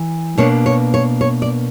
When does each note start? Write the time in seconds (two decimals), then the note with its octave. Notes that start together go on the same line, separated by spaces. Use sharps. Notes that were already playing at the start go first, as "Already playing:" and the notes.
Already playing: E3
0.38 B2 A#3 D4 C#5
0.66 C#5
0.94 C#5
1.21 C#5
1.42 D5